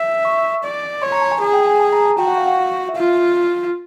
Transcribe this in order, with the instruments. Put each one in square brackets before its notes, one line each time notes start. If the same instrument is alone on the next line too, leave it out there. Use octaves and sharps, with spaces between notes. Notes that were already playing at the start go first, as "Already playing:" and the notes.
Already playing: [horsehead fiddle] E5
[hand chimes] C#6
[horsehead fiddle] D5
[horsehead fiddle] C#5 [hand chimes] C6
[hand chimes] A#5
A5
G#5
[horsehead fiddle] G#4
[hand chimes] G5
G#5
A5
A#5
A5
[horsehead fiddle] F#4 [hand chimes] G5
[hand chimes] F#5
F5
F#5
E5
[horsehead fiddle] F4 [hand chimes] F5